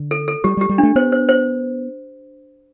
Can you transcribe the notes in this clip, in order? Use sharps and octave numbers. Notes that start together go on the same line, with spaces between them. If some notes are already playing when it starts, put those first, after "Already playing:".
Already playing: D3
A4
A4
G3 G4
G3
G4
G3
D4
A3
B3 C5
C5
C5